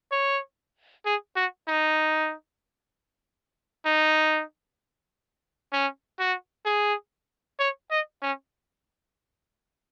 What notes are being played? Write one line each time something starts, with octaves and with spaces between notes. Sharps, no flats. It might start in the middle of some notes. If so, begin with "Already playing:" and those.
C#5
G#4
F#4
D#4
D#4
C#4
F#4
G#4
C#5
D#5
C#4